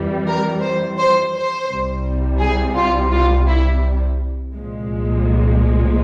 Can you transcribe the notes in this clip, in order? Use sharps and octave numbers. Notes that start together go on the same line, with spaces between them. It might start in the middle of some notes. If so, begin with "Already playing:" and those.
Already playing: F2 E3 G3
A#4
C5
C5
C5
C2 C3 G3
G#4
F4
F4
E4
C2 A#2 F3 G#3